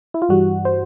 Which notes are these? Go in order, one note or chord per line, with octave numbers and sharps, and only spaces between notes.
E4
F4
G2 E3 G3 F#4
C5